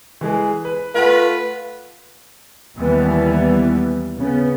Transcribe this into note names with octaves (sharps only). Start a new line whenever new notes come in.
E3 G#3 G#4
B4
A3 F4 B4 F5 F#5
D#2 E3 G3 B3
C#3 B3